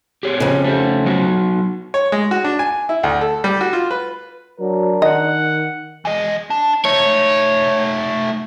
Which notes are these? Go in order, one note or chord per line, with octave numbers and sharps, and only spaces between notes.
G4 G#4 C#5
F2 C#3
A3 C5
F#3 D#4 F#4
C#5
G#3
F#4
D4
G#5
E4
D2
A4
G3
F#4
F4
B4
F#3 D4 A#4
D#3 D#5 F#5
E3 D#5
D4
A3 D#4 C#5